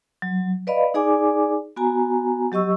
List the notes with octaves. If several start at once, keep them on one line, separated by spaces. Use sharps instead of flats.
F#3
B4 D5 D#5 F5 B5
D#4 G#4 D5 G#5 D6
B3 F#4 G#5 A#5
F#3 G4 D#5 C#6 E6